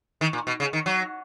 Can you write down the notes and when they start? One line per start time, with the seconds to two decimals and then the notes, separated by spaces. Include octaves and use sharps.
0.21 D#3
0.33 A#2
0.47 B2
0.60 C#3
0.73 D#3
0.86 F#3